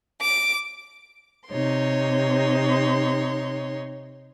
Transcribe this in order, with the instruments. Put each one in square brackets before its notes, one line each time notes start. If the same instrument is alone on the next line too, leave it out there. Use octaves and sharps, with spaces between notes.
[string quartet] D6
C3 D#4 C#5 C6